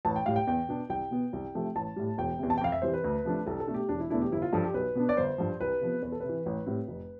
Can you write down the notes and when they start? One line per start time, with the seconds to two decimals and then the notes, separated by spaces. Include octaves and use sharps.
0.05 A1 A5
0.16 G5
0.26 A2 G3 F5
0.36 G5
0.47 E2 G5
0.69 B2 B3 D4
0.89 C2 G5
1.11 B2 B3
1.33 C2
1.55 C3 F3 A3
1.75 A1 A5
1.96 A2 G3
2.18 E1 G5
2.39 E2 C3
2.50 A5
2.58 G5
2.61 F2 F5
2.72 E5
2.82 C3 E3 G3 C5
2.94 B4
3.04 D2
3.24 C3 F3 A3 D4
3.46 C2 A4
3.60 A4
3.67 B2 A3 D4
3.74 G4
3.89 E1 D4
4.00 E4
4.10 E2 B2 A3 D4 E4
4.22 G4
4.32 G1 E4
4.42 F4
4.53 G2 F3 A4
4.64 G4
4.74 B1 B4
4.95 B2 B3 D4
5.09 D5
5.17 G1 C5
5.38 G2 F3
5.61 C2 B4
5.81 C3 F3 B3
6.02 E2 B4
6.12 A4
6.20 C3 B4
6.29 E3
6.46 A1
6.66 A2 G3 C4
6.88 F1